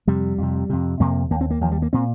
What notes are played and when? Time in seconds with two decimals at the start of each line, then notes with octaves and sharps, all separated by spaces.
0.07 F2 C3 G3
0.38 F2 C3
0.70 F2 C3
1.00 F2 C3 A#3
1.30 D#2 A#3
1.41 C4
1.50 A#3
1.61 D#2 F3
1.72 G3
1.82 A#3
1.93 A#2 C4